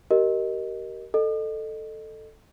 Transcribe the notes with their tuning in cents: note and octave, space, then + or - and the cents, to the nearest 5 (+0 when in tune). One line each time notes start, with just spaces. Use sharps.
G4 -30 A#4 +0 D#5 +0
A4 +0 D#5 -30